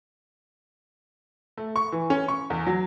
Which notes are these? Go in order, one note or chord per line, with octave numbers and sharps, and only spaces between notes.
A3
C#6
E3
C#4
C#6
E2
F#3